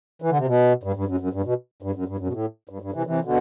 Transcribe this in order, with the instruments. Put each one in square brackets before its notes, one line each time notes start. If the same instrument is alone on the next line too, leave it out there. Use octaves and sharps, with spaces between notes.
[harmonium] E3
D3
C3
B2
G2
G2
F#2
F#2
G2
B2
G2
F#2
G2
F#2
B2
A2
G2
G2
C3 E3
C3 E3
B2 D3